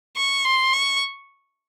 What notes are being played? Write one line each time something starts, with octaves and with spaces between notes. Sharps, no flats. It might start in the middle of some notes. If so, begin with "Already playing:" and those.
C#6
C6
C#6